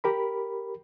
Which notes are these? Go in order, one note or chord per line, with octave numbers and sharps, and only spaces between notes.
G4 A#4 B5